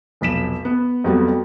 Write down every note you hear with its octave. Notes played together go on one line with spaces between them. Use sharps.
F1 B1 B6 E7
B3
F2 F#3 G3 A3 B3